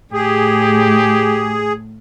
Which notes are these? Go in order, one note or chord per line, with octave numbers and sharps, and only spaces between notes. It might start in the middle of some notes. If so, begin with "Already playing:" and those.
A2 G4 G#4